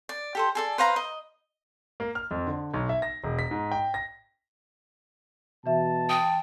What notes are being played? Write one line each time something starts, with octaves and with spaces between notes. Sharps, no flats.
D5
G4 A4 C5
G#4 A4 D5
B4 C5 F5 A#5
D#5
A#3
F6
F2
D3
B1
E5
A#6
E1
B6
G#2
G5
A#6
B2 E3 E5 A5
G5 D#6